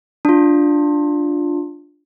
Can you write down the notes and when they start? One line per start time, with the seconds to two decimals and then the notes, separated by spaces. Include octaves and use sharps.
0.25 D4 F4